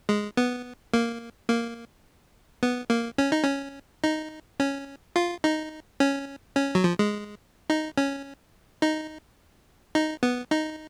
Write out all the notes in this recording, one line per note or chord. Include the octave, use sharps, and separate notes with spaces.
G#3
B3
A#3
A#3
B3
A#3
C#4
D#4
C#4
D#4
C#4
F4
D#4
C#4
C#4
F#3
F3
G#3
D#4
C#4
D#4
D#4
B3
D#4